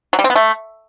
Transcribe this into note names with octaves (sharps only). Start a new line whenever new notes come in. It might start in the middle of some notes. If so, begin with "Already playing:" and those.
F#3
G3
C4
B3
A3